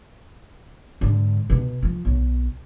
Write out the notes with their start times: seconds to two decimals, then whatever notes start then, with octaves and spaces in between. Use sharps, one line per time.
1.01 G#2 D3
1.50 B2
1.83 F3
2.05 B1